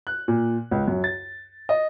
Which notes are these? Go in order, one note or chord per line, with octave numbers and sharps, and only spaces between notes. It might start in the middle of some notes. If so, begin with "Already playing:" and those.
F#6
A#2
C#2
F#2
A6
D#5